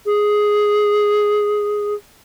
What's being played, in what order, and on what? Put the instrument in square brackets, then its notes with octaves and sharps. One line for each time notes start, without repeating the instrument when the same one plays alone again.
[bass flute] G#4